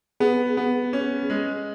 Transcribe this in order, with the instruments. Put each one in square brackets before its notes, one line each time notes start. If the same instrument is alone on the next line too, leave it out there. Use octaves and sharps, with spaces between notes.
[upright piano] B3 [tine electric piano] G#4
[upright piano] B3
C#4
G#3